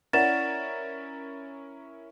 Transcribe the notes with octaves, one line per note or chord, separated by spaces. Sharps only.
C#4 E4 A#4 D5 F#5 A6 E7